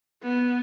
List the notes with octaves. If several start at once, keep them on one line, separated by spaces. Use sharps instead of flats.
B3